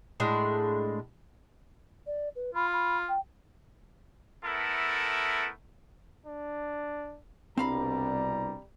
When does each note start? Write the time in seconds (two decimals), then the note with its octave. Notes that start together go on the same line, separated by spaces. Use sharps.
0.20 A2 G#3 D4
2.06 D5
2.35 B4
2.55 F4 B5
2.72 B5
3.08 G5
4.45 A3 B3 E4 A4 A#4
6.26 D4
7.57 C2 B2 G3 C4 D4 F5 A#5 B5